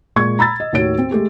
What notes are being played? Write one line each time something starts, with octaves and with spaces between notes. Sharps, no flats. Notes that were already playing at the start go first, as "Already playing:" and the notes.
A#2 G#3 C#6 G#6
A#5 B5 E6 A6
D#5
D#2 A2 D#3 F#4 C#5 D7
C4
G#3 A3 G4 G#4